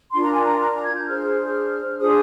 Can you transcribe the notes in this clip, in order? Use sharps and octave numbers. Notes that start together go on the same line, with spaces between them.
D4 F4 A#4 C6
A#5
G#5
A#5
A#5
A#5
G#6
G6
D4 G#4 C5 F6
D4 F4 G#4 C5 D#6